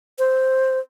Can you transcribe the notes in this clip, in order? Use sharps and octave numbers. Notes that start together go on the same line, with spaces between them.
C5